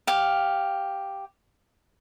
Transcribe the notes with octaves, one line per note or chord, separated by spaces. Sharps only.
G4 F5